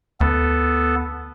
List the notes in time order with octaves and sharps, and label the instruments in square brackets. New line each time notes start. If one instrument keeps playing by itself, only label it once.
[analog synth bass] D2 [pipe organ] B3 A4